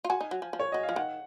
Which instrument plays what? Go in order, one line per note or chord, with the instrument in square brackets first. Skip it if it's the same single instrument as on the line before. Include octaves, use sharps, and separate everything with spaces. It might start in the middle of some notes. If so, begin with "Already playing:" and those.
[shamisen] F4
[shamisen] F#4 [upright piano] G#5
[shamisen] D#4
F#3
F3
F3
[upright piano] C#5
[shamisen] F#3 [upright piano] D#5
[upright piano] F5
[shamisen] F3
[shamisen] D#3 [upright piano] F#5